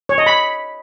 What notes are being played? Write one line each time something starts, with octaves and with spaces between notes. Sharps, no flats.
C#5
D#5
B5